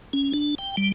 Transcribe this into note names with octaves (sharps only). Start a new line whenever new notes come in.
C#4
D4
G5
G3